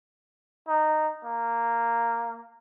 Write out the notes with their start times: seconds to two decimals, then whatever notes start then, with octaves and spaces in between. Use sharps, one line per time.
0.68 D#4
1.24 A#3